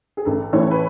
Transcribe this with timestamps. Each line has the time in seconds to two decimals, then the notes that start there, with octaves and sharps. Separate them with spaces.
0.17 G#4
0.25 A1 A4
0.53 A2 E3 A3 C#5
0.71 B4